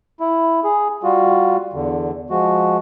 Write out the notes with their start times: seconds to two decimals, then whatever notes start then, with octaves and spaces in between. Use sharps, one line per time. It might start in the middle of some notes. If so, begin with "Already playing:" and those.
0.20 E4
0.64 G#4
1.03 G3 F4 F#4
1.73 E2 D3
2.30 F3 G#3 F#4